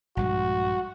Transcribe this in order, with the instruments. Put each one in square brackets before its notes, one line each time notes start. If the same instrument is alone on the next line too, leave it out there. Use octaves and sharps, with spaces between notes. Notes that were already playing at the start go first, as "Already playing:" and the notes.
[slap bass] A#1 G2 G#3 [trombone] F#4